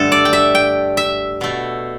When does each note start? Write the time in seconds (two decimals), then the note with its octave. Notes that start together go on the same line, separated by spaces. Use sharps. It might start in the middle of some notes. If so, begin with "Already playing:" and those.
Already playing: G2 D3 A3 A4
0.12 D5
0.25 G5
0.33 E5
0.55 G5
0.97 E5
1.41 B2 A3